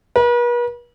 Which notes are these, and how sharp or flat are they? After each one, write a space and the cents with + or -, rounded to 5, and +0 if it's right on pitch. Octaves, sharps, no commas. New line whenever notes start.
B4 -45